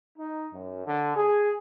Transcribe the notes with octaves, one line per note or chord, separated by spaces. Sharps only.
D#4
F#2
D3
G#4